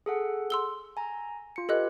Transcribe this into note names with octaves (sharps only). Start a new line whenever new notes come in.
G#4 A4 F#5
C6 E6 G7
G#5 A#5
F4 C#7
G4 A4 B4 D#5 F#6